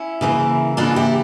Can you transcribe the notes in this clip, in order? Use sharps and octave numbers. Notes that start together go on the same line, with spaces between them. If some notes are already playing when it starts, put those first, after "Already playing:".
Already playing: C#4 E4
C#3 E3 A#3
C#3 E3 A#3 D4 F4
E4 G4